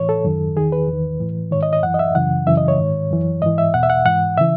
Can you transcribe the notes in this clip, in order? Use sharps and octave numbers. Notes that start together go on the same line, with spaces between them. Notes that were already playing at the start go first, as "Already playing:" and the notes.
Already playing: A2 E3 C#5
A4
F#2 D#3
E2 D#3 G#4
B4
E2
D#3
A2 E3
G#2 D#3 C#5
D#5
D#5
F#2 E3 F#5
D#5
E5
F#2 C#3 E3 F#5
F#2 C#3 E3 E5
D#5
C#5
G#2 D#3
F#2 E3
G#2 E3 D#5
E5
E2 B2 F#5
E5
F#5
G#2 E3 F#5
C#3 E3 E5